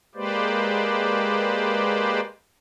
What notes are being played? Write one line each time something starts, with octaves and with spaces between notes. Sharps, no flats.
G#3 A#3 G4 B4 C5 D5